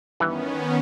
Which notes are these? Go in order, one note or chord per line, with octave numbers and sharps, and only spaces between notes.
G2 D#3 E3 B3 C#4